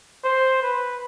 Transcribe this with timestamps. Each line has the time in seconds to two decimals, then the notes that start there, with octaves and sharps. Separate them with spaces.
0.24 C5
0.63 B4